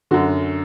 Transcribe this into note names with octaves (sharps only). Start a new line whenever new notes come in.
F#2 D3 F#4